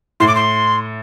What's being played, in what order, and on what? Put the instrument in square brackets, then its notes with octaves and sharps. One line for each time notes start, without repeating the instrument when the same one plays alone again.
[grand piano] A2 [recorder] C6
[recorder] D6
C6